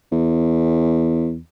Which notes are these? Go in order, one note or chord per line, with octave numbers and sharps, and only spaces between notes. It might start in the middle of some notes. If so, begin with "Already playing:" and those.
E2